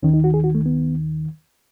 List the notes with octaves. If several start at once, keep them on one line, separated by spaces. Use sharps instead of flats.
D#2 D#3 C#4
D#4
F#4
G#4
F#4
A3
B3